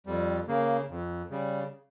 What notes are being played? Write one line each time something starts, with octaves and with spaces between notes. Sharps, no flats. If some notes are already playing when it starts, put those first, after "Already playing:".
F2 G3
C#3 A#3
F2
C#3 G3